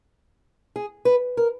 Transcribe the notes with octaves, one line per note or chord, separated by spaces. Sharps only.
G#4
B4
A#4